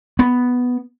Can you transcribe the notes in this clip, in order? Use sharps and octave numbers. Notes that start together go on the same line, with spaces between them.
B3